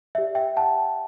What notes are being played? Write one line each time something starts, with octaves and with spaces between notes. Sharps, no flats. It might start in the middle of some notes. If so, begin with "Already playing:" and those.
G4 D5 E5
E5 G5
F#5 A5